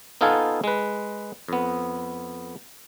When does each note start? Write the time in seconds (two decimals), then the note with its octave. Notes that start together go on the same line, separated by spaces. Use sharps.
0.21 B3 D#4 F4 A4 F5 G#5
0.64 G#3 B4
1.48 F2 B3